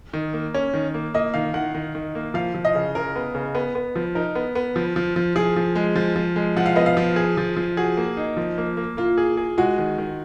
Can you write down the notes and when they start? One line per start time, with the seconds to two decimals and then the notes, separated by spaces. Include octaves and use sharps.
0.14 D#3
0.33 A#3
0.54 C#4
0.74 D#3
0.94 A#3
1.14 A#3 D#5
1.34 D#3 F5
1.54 D#3 F#5
1.75 D#3
1.95 D#3
2.15 A#3
2.34 F3 F5
2.54 F3
2.65 D#5
2.75 C#3
2.95 C#3 A#4
3.16 B3
3.34 C#3
3.55 B3
3.75 B3
3.96 F3
4.15 D#4 A#4
4.35 B3
4.55 B3
4.76 F3
4.96 F3
5.16 F3
5.36 F3 G#4
5.56 F3
5.75 G#3
5.96 F3
6.16 F3
6.36 G#3
6.56 F3 F#5
6.66 F5
6.76 B3 D#5
6.86 F5
6.97 F3
7.16 G#4
7.37 F3
7.56 F3
7.77 F#4 G#4
7.97 A#3
8.17 D#4
8.37 F3
8.58 A#3
8.77 A#3
8.97 A#3 F4
9.18 G#4
9.37 G#4
9.58 G#3 F#4
9.78 D#3
9.98 D#3